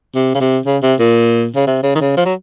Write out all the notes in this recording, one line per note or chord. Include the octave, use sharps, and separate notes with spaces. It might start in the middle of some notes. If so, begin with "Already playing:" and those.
C3
C#3
C3
C#3
C3
A#2
C#3
C3
C#3
D#3
C#3
F3
F#3